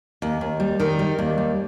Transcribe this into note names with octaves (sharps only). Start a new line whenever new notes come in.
D#2
D#2
G3
D#3
G3
D#2
G3